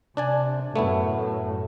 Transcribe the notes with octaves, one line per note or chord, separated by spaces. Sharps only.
C3 D4 D5 G#5
F#2 A2 A3 B3 E4